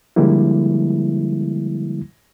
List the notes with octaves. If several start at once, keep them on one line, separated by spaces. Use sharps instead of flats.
D3 F3 G3 G#3 A#3 E4